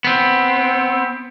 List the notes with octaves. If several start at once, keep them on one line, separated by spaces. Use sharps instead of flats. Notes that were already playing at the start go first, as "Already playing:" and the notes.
B3 C4